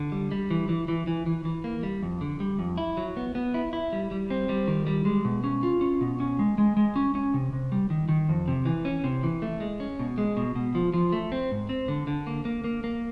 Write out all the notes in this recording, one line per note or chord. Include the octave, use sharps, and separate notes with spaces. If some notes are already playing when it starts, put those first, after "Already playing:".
Already playing: D3
G3
G3
E3
E3
E3
E3
E3
E3
A#3
G3
F2
D3
G3
F2
E4
F#3
B3
B3
E4
E4
G3
G3
C4
G3
D#3
G3
G#3
B2
C#4
F4
C#4
B2
C#4
G#3
G#3
G#3
C#4
C#4
C3
C3
G3
D#3
D#3
F2
C3
E3
C#4
C3
E3
A3
G#3
C#4
B2
G#3
B2
B2
F3
F3
A3
C4
G#2
C4
D3
D3
A#3
A#3
A#3
A#3